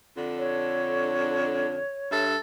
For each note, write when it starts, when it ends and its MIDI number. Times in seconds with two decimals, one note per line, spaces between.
0.17 1.80 41
0.17 1.80 50
0.17 1.80 62
0.38 2.24 73
2.11 2.37 43
2.11 2.37 69
2.11 2.37 76